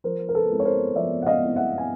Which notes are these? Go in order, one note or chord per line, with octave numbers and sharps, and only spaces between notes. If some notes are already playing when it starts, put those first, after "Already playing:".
F3 A#4 C5
A#4
A4 B4
G#3 C4 E4
C#5
A#4 C5
F3 D5 E5
F#5
D#5 F5
G#3 C4 E4
E5 F#5
G#5